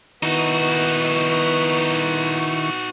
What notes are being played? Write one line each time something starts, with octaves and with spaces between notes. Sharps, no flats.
D#3 B3 D#4 E4 F#4 C#6